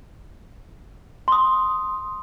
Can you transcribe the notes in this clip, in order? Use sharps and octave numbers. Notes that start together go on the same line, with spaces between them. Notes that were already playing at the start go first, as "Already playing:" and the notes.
C6 D#6